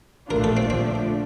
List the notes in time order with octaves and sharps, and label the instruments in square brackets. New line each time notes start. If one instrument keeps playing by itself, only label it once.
[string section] A#1 A2 A3 D4 F4 [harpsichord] A#4
[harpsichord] A4
C4
[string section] D3 F3 A3 D4 [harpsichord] C4